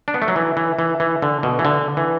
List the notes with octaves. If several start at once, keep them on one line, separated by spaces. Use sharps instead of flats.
D4
B3
A3
F#3
E3
E3
E3
E3
D3
B2
E3
D3
E3